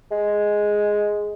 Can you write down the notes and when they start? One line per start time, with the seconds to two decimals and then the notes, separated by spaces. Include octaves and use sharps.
0.11 G#3